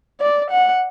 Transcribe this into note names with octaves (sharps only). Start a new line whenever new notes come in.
D5
F#5